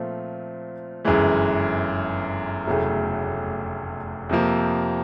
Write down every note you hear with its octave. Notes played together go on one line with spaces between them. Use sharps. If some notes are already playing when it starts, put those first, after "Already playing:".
Already playing: A#2 F3 A3 C4 F4
G1 F#2 C#3 E3 G#3
F1 E2 C#3 F#3 A3
F2 C3 F3 A#3